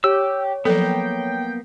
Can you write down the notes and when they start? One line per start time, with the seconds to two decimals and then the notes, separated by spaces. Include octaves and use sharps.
0.04 G4 C#5 E6
0.65 F3 F#3 A#3 B3 A4 G5